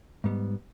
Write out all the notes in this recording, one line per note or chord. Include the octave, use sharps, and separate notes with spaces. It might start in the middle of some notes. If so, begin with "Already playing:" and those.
G#2 G3 B3